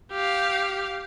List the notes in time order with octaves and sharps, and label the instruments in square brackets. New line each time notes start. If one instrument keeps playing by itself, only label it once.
[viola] G4 F5